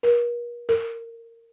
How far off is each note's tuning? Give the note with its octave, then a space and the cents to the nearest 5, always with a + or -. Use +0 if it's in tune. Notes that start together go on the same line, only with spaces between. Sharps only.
A#4 +40
A#4 -20